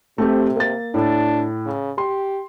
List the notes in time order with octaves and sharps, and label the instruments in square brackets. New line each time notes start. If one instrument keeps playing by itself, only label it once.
[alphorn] C3 [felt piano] A3 C4 G4
[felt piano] A#3 A6
[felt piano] A2 [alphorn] D4
[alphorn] C#3
[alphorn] G4 [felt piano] C6